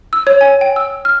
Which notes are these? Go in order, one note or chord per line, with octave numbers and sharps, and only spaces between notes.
E6
C#5
G#5
G5
E6
F6